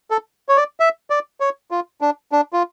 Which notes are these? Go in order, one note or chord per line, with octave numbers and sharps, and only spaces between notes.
A4
C#5
D5
E5
D5
C#5
F4
D4
D4
F4